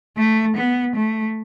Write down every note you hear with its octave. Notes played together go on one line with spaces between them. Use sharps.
A3
B3
A3